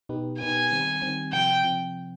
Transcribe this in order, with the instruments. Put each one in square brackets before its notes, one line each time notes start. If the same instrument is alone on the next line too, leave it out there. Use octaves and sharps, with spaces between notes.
[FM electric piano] B2 B3 D#4 G4 B4
[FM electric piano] B2 B3 D#4 G4 B4 [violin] G#5
[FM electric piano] D#3 G3 C4
D#3 G3 C4
[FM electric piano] C3 F3 C4 [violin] G5
[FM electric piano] C3 F3 C4